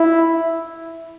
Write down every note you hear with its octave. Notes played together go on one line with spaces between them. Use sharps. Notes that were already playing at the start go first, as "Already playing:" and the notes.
Already playing: E4